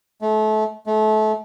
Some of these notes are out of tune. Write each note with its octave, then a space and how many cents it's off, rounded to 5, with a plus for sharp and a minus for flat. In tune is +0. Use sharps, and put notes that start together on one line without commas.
A3 -30
A3 -30